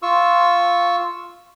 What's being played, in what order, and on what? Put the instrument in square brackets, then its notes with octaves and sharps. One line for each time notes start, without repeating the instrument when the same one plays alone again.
[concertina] F4 C#6 E6